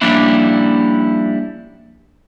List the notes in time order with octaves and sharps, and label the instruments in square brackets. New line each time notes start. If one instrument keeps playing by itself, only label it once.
[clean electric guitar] F3 G3 A#3 C#4 D4 E4